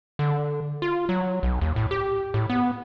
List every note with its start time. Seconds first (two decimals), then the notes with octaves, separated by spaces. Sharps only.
0.19 D3
0.82 F4
1.09 F#3
1.43 B1
1.61 D#2
1.76 A2
1.91 G4
2.34 A2
2.50 B3